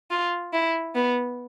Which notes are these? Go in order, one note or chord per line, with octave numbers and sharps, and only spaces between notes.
F4
E4
B3